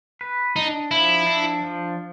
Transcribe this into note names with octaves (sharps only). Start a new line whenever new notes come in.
B4
D4 D#4
F3 E4
D4
F3